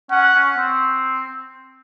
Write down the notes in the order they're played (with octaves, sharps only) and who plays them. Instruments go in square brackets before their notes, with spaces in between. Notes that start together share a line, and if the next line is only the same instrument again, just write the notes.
[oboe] C#4 [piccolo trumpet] F#5
[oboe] C#4
C4